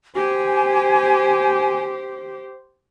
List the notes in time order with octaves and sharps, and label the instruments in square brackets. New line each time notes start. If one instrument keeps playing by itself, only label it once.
[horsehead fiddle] G4 C5 [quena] G#5